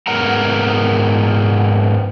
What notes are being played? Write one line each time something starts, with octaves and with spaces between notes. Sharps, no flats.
G#2 B3 A#4 F#5 A#5